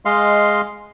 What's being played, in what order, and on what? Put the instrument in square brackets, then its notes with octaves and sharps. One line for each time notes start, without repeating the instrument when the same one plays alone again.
[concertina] G#3 D#5 F5 C6